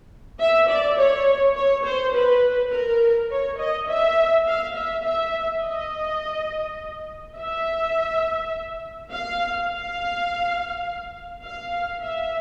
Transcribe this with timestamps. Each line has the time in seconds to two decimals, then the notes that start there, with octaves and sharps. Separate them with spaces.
0.40 E5
0.69 D5
0.97 C#5
1.56 C#5
1.85 C5
2.14 B4
2.72 A#4
3.30 C#5
3.59 D#5
3.88 E5
4.46 F5
4.75 E5
5.04 E5
5.63 D#5
7.37 E5
9.11 F5
9.69 F5
11.44 F5
12.02 E5